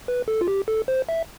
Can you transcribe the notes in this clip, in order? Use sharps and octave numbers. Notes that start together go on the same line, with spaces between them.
B4
A4
F4
G4
A4
C5
E5